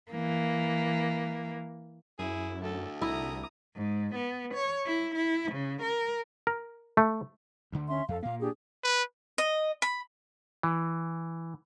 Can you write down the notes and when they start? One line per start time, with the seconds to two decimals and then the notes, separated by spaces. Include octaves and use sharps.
0.12 E3 A#3
2.19 F#2 E4 G#4
2.63 D2 A4
3.02 C2 E4 A#5 D#6
3.75 G#2
4.15 B3
4.54 C#5
4.86 E4
5.15 E4
5.52 C#3
5.82 A#4
6.47 A#4
6.97 A3
7.72 D2 D3
7.88 C#4 E5 C6
8.09 F2 A4 F5
8.23 A#2 A#3 F5
8.40 D4 G4 G#4
8.84 B4
9.38 D#5
9.82 B5
10.63 E3